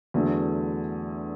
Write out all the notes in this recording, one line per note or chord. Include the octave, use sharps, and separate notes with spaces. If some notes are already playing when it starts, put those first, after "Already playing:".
E2 D3 F#3 A3